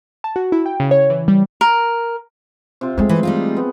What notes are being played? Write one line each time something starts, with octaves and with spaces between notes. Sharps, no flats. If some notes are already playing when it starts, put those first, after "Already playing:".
A5
F#4
E4
G5
C#3
C#5
E3
G3
A#4
C3 F4
C3 G#3 A3 G#4
E3
G3 D#4 F4
B3